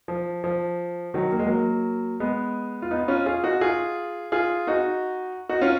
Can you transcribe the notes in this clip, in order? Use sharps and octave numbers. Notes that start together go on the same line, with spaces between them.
F3
F3
D#3 F#3
A#3
G#3
F#3 A#3
G#3 B3
F4
B3 D#4
C#4 F4
F4 G#4
D#4 F#4
F4 G#4
F4 G#4
D#4 F#4
D#4 F#4
C#4 F4